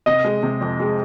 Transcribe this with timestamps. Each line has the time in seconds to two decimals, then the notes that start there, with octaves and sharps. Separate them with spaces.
0.06 C3 D#5
0.24 G#3
0.43 C3
0.61 F2
0.80 G#3